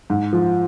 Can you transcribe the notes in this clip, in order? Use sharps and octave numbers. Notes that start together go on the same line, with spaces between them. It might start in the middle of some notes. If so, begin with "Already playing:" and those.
G#2
F3